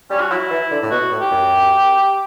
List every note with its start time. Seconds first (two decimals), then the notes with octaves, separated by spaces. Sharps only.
0.10 G3 C#4
0.21 F#4
0.31 F#3 E4
0.51 E3
0.71 D3
0.83 A2
0.91 B2 F#4
1.12 A2
1.21 G4
1.31 F#2